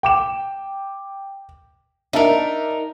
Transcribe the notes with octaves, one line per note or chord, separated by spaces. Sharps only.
G5 D6 E7
D4 D#4 A#4 E5 A5